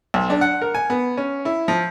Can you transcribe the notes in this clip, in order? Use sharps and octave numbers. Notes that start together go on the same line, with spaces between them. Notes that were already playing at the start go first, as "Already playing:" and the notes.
B1
D4
F#5
A#4
G#5
B3
C#4
E4
F3